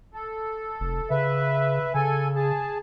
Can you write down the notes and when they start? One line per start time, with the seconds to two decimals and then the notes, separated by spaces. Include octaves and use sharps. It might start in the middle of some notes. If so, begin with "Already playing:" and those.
0.14 A4
0.80 F1
1.10 C#3 B4 E5
1.94 C#3 A4 G#5
2.36 G#4 A5